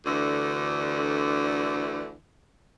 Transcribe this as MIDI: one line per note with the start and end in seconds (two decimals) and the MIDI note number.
0.06 2.15 38
0.06 2.15 50
0.06 2.15 52